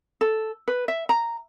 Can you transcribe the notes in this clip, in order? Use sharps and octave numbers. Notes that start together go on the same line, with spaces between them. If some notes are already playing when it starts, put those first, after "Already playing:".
A4
B4
E5
A#5